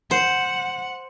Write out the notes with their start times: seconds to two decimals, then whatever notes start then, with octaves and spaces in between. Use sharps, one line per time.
0.11 C5 F#5